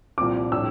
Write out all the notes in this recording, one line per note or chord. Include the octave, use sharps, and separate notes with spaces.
C2 A#2 F3 C4 D6
A2 G3 D4 E6